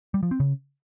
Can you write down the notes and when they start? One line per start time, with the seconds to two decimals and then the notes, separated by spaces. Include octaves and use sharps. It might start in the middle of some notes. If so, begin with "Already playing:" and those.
0.14 G3
0.23 F3
0.31 C4
0.40 C#3